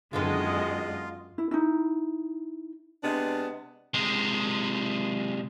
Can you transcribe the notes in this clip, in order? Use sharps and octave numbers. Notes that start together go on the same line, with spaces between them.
F#2 D3 D#3 G#3 B3 F4 D#5
E4
D#4 E4
C3 G#3 B3 D4
C3 G#3